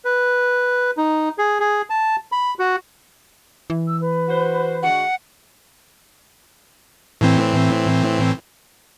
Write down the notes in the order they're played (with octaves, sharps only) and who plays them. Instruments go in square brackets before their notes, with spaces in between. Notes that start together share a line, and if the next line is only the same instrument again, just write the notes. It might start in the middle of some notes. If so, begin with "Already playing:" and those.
[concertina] B4
D#4
G#4
G#4
A5
B5
F#4
[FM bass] E3
[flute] E6
B4
[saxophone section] F#4 C5
[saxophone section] D3 G#3 F#4 [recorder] F#5
[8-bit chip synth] A2 E3 C4